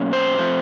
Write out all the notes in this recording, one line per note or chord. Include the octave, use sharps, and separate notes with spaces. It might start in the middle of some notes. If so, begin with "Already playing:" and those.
Already playing: B2 F#3 A#3 C#4
C5
F3 A3 C4